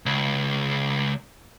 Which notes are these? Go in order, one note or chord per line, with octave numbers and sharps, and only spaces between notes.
C#2